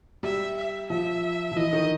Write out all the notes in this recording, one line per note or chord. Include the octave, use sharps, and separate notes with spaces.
G3 E5
E5
F3 E5
F3
E3 D#5
D#3